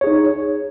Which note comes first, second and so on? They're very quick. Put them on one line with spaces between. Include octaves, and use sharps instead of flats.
C#5 G#4 D#4